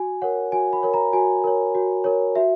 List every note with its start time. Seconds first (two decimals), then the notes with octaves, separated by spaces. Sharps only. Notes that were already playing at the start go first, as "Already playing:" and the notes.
Already playing: F#4 G#5
0.22 A#4 C#5 F#5
0.52 F#4 G#5
0.73 B5
0.83 A#4 C#5
0.94 A#5
1.13 F#4 G#5
1.44 A#4 C#5
1.75 F#4
2.04 A#4 C#5
2.35 F#4 E5